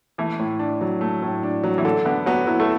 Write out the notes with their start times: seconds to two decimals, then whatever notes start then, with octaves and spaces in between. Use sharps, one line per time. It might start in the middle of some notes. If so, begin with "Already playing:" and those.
0.18 E3 A3
0.39 A2
0.59 D4
0.81 F#3
1.01 A3
1.22 A2
1.43 D4
1.64 F#3
1.78 E3
1.85 D3 A4
2.05 D3 B3
2.26 F#3 B3
2.47 F#3 E4
2.60 A3